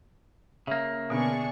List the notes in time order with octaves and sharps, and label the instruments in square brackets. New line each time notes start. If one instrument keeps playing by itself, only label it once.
[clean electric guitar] C#3 A#3 [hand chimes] E5
[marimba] B2 D3 B3 [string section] D4 G#4 C#6